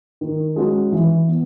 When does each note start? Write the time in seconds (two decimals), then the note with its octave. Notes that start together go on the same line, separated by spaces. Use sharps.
0.21 D#3
0.56 G#3 C#4 F#4
0.92 E3
1.28 B3